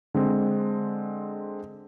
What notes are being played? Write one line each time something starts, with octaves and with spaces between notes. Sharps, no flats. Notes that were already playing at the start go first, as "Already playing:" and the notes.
D3 G#3 C4